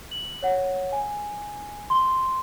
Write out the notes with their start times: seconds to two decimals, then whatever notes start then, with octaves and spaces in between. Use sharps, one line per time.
0.11 F#7
0.43 C#5 F#5
0.92 G#5
1.90 C6